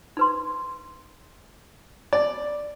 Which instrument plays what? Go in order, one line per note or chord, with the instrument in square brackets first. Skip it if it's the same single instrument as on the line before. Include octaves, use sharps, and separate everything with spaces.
[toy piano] D#4 B4 C6
[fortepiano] D5